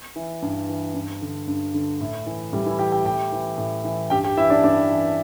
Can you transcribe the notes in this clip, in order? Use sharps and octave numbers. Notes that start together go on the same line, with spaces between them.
E3
G2
E3
G2
D3
G2
D3
A2
E3
A2 G3 G4
E3 E4
E3 G4 G5
G4 G5
A2 G4 G5
E3
A2
E3
G2 G4 G5
G4 G5
E3 E4 E5
D4 D5
G2 D4 D5
E3